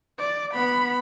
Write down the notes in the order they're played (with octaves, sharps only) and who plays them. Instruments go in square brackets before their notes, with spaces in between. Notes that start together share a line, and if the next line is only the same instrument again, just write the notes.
[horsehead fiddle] D5
B3 B5